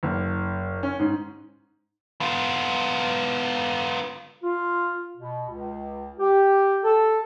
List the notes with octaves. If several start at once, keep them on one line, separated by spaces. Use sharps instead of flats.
F#1
C#4
G#2
B3 F4
F4
B2
C#2
G4
A4